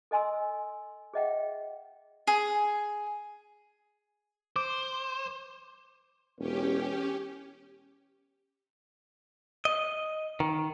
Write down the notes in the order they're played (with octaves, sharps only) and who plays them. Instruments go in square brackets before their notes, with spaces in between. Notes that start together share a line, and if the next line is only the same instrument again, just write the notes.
[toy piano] A4 D#5 G#5 C6 E6
G#4 C#5 D#5 E5 F#5 G5
[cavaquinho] G#4
[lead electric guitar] C5 [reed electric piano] D6
[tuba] E1 [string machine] C#4 G4
[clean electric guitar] D#5
D#3